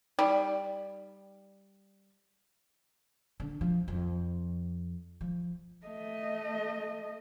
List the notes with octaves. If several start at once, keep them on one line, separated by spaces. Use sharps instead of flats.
G3 D#4 D5
D3
F3
F2
F3
A3 D#5